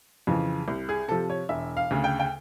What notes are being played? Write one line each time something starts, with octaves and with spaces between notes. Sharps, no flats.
F2 C#3 E3
C2
G#4
C3 F3 A4
C#5
E1 E5
F5
D2 C#3
G5
G5